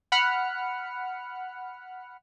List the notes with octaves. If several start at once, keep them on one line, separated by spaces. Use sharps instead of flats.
F#5 B5 F6 C#7